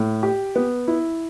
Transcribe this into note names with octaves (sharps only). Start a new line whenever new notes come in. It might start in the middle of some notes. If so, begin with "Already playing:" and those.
Already playing: A2
G4
B3
E4